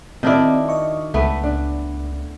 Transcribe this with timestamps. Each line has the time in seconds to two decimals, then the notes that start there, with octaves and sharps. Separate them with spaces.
0.23 D#3 C4 D4 E4 F#4 D5
0.69 D#5 C#6
1.14 C#2 A3 B3
1.44 D4